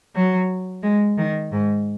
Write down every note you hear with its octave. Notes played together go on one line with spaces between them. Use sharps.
F#3
G#3
D#3
G#2